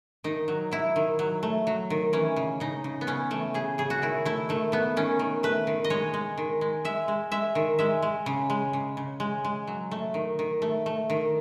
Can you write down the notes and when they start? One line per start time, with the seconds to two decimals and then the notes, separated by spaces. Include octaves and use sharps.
0.24 D#3 D#4
0.48 F#3
0.71 F#3 E4
0.96 D#3
1.19 F#3
1.43 A3
1.67 F#3
1.90 D#3
2.13 E3 C#4
2.36 C#3
2.60 C#3 D#4
2.84 C#3
3.01 B3
3.07 C#3 C#4
3.31 E3 A3
3.54 C#3 G#4
3.78 C#3 G#4
3.90 F#4
4.02 D#3 E4
4.25 A3 E4
4.49 D#3 A3
4.72 A3 B3
4.97 D#3 C#4
5.19 D#3
5.43 A3 B4
5.67 D#3
5.84 D#5
5.90 G#3 C#5
6.14 G#3
6.38 D#3
6.61 G#3
6.85 G#3 E5
7.08 G#3
7.32 G#3 E5
7.55 D#3
7.79 G#3 E5
8.02 G#3
8.26 C#3
8.50 G#3
8.73 C#3
8.97 C#3
9.20 G#3
9.45 G#3
9.67 F#3
9.91 A3
10.14 D#3
10.39 D#3
10.62 A3
10.86 A3
11.10 D#3